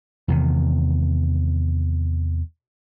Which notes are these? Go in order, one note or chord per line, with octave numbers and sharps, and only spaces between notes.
E2 C3 D#3